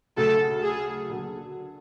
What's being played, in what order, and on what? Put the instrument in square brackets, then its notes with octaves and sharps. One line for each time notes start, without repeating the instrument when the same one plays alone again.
[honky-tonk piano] D2 C#3 F#3 A3 [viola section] A4
[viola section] G#4
[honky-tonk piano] D3 F#3 A#3